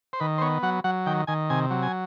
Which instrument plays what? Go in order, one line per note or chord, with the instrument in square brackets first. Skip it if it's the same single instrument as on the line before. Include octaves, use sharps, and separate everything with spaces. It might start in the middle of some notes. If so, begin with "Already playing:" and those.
[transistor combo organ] C5
D#3 B4
C5
B3 C#5
F#3 F#5
F#3 F#5
D#3 G5
D#3 G#5
C3 G#5
F#3
G#5